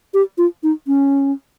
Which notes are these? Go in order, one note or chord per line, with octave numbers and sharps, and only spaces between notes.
G4
F4
D#4
C#4